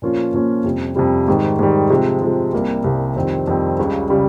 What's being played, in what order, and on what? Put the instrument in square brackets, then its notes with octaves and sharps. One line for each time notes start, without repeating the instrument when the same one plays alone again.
[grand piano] A#2 F3 A#3 C#4 F4
A#2 F3 A#3 C#4 F4
F2 C3 G3
F2 C3 G3
G#2 D#3 G3
G#2 D#3 G3
C3 F3 G#3
C3 F3 G#3
C2 C3 G3 A#3
C2 C3 G3 A#3
F2 D#3 G3 C4
F2 D#3 G3 C4
C#2 C#3 G3
C#3 G3